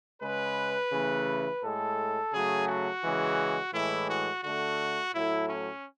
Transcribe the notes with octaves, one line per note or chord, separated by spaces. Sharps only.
C#3 G#3 B4
C#3 E3 A3
A2 G#3 A4
C#3 F#3 A3 G#4
F#4
C#3 E3 G#3
A2 E3 G#3 E4
F#4
D3 A3 F#4
A2 F#3 A3 E4
C#4